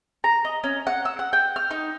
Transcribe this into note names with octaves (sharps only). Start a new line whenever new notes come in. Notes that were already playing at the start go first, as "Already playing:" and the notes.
A#5
D#5
C#4
F#5
E6
F#5
G5
F6
D#4